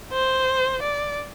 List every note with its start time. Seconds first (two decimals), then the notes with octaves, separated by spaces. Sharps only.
0.12 C5
0.83 D5